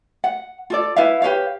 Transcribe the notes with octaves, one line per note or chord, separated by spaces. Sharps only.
F#5
F4 A4 D5
E4 B4 E5 F5
G4 B4 C#5 F5